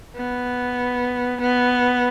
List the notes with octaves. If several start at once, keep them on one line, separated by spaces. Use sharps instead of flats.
B3
B3